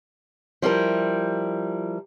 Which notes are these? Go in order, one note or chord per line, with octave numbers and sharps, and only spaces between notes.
F3 G3 E4 A#4